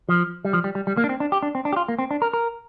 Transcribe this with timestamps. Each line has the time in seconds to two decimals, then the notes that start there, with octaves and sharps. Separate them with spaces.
0.09 F3
0.45 G3
0.53 F3
0.64 G3
0.75 G3
0.87 G3
0.97 A#3
1.04 D4
1.09 C4
1.20 D4
1.32 G4
1.43 D4
1.55 C4
1.65 D4
1.73 G4
1.76 F4
1.88 A#3
1.99 C4
2.11 D4
2.22 A#4
2.33 A#4